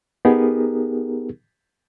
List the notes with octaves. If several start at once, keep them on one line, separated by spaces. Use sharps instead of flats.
B3 D#4 G4 G#4 A#4